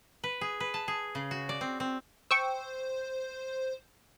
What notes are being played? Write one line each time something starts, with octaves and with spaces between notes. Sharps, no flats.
B4
G#4
B4
A5
G#4
C#3
F#4
D5
C4
C4
C5 G5 C#6 E6